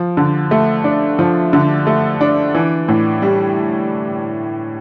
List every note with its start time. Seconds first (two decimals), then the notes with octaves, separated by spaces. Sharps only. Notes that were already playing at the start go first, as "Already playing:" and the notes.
Already playing: F3
0.17 D3
0.51 A3
0.84 D4
1.19 F3
1.53 D3
1.87 A3
2.21 D4
2.55 E3
2.88 A2
3.22 G3